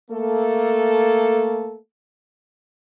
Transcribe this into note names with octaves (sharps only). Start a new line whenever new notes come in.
A3 A#3 A4